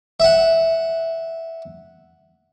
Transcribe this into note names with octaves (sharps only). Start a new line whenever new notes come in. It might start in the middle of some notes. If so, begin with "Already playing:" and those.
E5 F#5